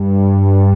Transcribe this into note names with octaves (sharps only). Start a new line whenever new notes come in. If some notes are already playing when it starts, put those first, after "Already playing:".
Already playing: G2